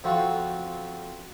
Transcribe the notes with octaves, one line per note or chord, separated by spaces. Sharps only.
F2 C4 F4 F#4 C#6